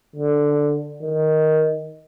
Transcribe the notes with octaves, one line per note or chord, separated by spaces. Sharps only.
D3
D#3